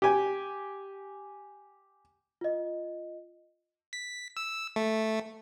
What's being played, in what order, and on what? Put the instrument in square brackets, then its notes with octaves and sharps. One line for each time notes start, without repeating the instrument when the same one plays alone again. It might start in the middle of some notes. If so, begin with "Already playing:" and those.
[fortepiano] G4 G#5
[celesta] F4 D#5
[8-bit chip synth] B6
E6
A3